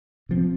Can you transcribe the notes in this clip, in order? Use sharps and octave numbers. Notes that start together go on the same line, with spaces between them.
C3 F3 C4